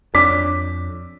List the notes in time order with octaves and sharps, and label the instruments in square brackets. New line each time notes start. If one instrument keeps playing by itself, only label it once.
[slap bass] F2 [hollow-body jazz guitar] D4 C#5 D5 [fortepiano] D6 [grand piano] B6